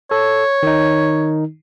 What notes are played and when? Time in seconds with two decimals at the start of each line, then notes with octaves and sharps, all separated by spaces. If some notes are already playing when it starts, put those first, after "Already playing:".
0.11 A4 C#5
0.63 D#3 D#4